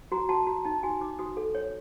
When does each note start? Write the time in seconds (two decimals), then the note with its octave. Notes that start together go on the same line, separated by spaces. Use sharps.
0.12 F#4 A#5
0.29 F#4 A5
0.47 F#4 A#5
0.65 D#4 A5
0.83 F#4 G#5
1.01 D#4 D6
1.19 F#4 D#6
1.37 A4
1.55 C#5